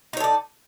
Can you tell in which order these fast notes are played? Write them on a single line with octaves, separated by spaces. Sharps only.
D#4 C#5 A4 D5